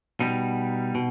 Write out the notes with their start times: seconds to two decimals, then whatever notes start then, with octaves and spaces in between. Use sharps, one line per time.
0.20 B2 G3 D#4
0.95 B2